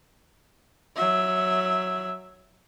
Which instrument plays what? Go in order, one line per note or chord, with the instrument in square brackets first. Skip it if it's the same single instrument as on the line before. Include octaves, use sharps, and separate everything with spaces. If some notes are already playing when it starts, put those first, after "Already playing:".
[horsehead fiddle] F#3 E5